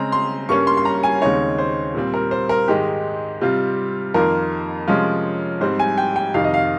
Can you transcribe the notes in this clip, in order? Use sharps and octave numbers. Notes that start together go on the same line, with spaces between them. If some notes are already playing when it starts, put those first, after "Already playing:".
Already playing: C#3 G#3 C4 A#5
C6
G2 G3 A#3 C#4 C#6
C6
C6
A#5
G#5
D#2 C#3 G#3 C4 D#4 C#5
C5
A#2 G3 C4
A#4
C5
A#4
G#2 D#3 G#3 D#4 G4
C3 G3 C4 F4
F2 D#3 A#3 F4 A#4
C3 F3 G#3 C#4 F4
G#2 G3 C4 C5
G#5
G5
G5
F2 C3 D#3 F5
D#5
F5